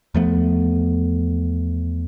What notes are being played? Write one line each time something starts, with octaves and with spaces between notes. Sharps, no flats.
E2 F3 A3 B3